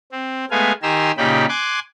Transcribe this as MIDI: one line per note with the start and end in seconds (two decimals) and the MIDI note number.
0.12 0.45 60
0.51 0.72 56
0.51 0.72 57
0.51 0.72 59
0.51 0.72 77
0.51 0.72 80
0.83 1.11 51
0.83 1.11 67
0.83 1.11 80
0.83 1.11 82
0.83 1.11 84
0.83 1.11 88
1.17 1.46 46
1.17 1.46 49
1.17 1.46 63
1.17 1.46 67
1.17 1.46 79
1.17 1.46 83
1.49 1.79 80
1.49 1.79 84
1.49 1.79 86
1.49 1.79 90